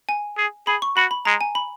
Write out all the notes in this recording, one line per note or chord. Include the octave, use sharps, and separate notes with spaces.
G#5
G#4
G#4 B5
C#6
F#4 B5
B5
G#3 A#5
G#5
B5